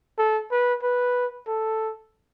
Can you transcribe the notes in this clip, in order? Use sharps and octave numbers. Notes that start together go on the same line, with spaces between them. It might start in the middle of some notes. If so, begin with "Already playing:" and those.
A4
B4
B4
A4